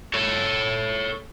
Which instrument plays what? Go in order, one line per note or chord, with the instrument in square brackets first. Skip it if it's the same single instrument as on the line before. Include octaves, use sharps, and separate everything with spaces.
[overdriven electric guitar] A4 C#5